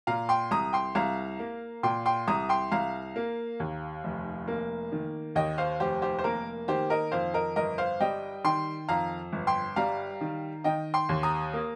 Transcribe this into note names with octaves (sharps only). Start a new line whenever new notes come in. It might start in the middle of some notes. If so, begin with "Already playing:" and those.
A#2 F5 A#5
G5 C6
C2 A#5 D#6
G5 C6
C2 F5 A#5
A#3
A#2 G5 C6
G5 C6
C2 A#5 D#6
G5 C6
C2 F5 A#5
A#3
D#2
F1
A#3
D#3
D#2 D#5 G5
C5 F5
F1 G4 C5
G4 C5
C5
A#3 A#4
D#3 G4 C5
A#4 D#5
F2 C5 F5
A#4 D#5
G1 A#4 D#5
C5 F5
G3 D#5 G5
D#3 G5 C6
F2 F5 A#5
G1
G5 C6
G3 F5 A#5
D#3
D#3 D#5 G5
G5 C6
D#2
A#5 D#6
A#3